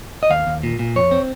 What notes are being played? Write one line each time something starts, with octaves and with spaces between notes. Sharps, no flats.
D#5
D#2 F5
D#2
A#2
A#2
F2 C#5
C4